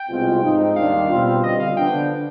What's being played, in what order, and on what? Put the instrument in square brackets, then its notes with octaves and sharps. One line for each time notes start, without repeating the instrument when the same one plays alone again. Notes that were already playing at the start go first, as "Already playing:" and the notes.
Already playing: [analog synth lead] G5
[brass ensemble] C2 B2 G#3 C4 F4
G#2 F3 C4 D#4
[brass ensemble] D#2 D#3 G3 D4 F4 [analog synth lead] F5
[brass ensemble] B2 G3 C4 F4
[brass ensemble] D3 G3 C4 F4 [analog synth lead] D#5
[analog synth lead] F5
[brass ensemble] D3 F3 B3 D4 [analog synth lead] G5